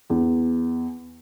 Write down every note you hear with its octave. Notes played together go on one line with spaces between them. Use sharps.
E2